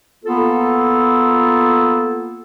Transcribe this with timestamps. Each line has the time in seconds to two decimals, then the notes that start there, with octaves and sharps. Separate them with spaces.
0.25 A#3 B3 F4 A4